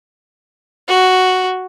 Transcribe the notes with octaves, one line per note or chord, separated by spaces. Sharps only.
F#4